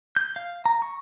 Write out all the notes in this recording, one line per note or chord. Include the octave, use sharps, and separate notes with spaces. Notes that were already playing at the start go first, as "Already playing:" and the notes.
G6
F5
A#5
C#6